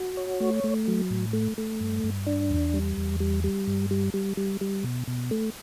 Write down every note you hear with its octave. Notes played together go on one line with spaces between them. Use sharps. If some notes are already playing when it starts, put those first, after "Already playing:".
Already playing: F#4
C#5
A3
A3
F#3
A2
A3
A3
G2
G2
D4
E2
G3
E2
G3
G3
G2
G3
G3
G3
G3
B2
B2
A3